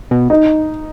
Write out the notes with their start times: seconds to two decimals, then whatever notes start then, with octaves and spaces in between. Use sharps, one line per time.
0.11 B2
0.30 D#4